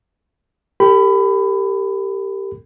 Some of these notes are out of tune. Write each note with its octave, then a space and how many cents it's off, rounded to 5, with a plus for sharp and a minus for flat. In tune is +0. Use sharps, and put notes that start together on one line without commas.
G4 +0 A#4 -45 B5 +20